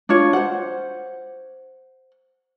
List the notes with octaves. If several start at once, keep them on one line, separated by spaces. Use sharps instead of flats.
D4 F4 C#5
C5 F#5